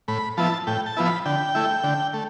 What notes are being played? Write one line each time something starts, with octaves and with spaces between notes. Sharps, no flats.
A2 B5
F3 B3 E4 A5
A2 G5
A5
F3 B3 E4
B5
D3 G5
A3 E4
D3
A3